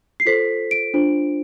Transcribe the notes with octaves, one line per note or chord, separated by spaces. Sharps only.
C7
F4 A4 C5 B6
D7
D4 F4 C5